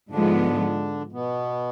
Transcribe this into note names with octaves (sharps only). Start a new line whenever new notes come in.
G#2 D3 F3 G#3 B3 D4
B2 B3